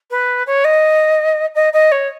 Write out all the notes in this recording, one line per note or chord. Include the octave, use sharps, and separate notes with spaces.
B4
C#5
D#5
D#5
D#5
C#5